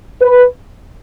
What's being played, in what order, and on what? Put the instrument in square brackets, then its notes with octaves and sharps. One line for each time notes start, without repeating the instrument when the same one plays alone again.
[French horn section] B4